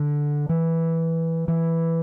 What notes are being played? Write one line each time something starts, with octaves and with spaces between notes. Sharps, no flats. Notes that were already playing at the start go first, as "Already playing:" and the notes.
Already playing: D3
E3
E3